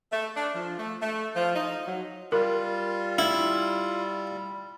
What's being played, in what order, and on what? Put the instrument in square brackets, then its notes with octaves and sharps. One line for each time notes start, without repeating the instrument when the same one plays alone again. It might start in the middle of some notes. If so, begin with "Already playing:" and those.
[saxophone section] A3
D4
F3
A3
A3
F3
D#4
F#3
[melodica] G3 [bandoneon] F4 [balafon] A#4
[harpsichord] E4